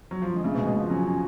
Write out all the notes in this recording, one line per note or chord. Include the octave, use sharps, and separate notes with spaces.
F#3
F3
D3 G#3
C#3 A3
B2
G#3
B2
F3 B3
F#3 C#4
C#4